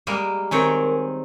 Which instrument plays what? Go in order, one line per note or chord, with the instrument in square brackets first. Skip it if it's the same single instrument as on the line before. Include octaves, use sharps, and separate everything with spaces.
[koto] G3 G#3 A#3
[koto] D#3 C4 C#5 [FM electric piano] A#4 G#5